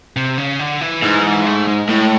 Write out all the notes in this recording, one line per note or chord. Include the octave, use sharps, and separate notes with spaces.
C3
C#3
D3
E3
G#2
A3
G#3
A2